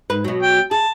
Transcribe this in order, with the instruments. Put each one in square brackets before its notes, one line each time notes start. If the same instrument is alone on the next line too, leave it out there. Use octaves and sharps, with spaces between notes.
[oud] G#2 B4
B2 F#3
[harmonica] G5
[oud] G#4 [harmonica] A5